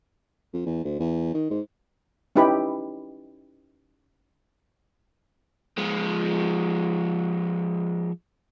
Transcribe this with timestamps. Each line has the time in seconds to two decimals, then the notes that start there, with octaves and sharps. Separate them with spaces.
0.53 F2
0.66 E2
0.84 D2
0.99 E2
1.34 D#3
1.50 G#2
2.36 C#4 D#4 E4 G4 B4 B5
5.78 F3 G#3